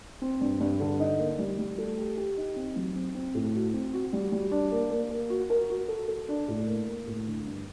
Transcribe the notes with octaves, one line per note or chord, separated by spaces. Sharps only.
C4
G2
G2
D3
D#4
A#3
G3
G3
A3
G4
G4
D#4
C4
F#3
C4
C4
A2
F#4
C4
F#4
G3
G3
D4
A#3
A#3
A#3
F#4
A#4
F#4
A4
A4
D4
A2
A#3
A#3
A2
D3
G2